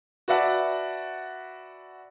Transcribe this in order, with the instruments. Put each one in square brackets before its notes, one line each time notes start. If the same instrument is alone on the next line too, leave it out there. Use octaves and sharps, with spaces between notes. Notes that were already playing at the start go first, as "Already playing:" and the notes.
[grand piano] F#4 B4 D5 E5 F#5 A5